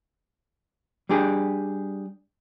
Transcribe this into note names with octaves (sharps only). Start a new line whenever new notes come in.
G3 D4 G4 G#4